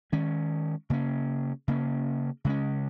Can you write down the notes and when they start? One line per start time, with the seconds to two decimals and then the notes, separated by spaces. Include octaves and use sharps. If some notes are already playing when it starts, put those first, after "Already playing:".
0.12 D#3 G#3 C#4
0.90 C#3 A#3 C#4
1.68 C#3 A#3 C#4
2.45 C#3 G#3 C#4